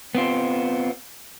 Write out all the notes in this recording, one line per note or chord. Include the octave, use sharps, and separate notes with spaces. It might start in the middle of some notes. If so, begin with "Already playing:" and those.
B3 C4 F4